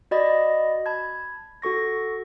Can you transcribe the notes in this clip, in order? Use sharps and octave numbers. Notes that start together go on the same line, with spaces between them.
F#4 D5 D#5 B5 A6 A#6
A5 B5 G#6
F#4 A4 C#6 A#6